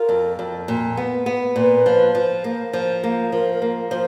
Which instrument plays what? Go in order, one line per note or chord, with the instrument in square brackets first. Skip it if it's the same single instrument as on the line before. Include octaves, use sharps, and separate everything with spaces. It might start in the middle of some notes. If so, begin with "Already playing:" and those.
Already playing: [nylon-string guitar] F4 [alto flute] A#4
[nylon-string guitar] F2
F2
A#2
B3
B3
[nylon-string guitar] A#2 [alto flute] B4
[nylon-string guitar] F3
F3
A#3
F3
A#3
[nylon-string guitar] F3 [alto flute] A#4
[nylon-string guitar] A#3
F3